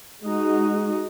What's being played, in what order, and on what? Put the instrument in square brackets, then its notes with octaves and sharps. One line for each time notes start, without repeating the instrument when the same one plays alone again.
[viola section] G#3 D#4 F#4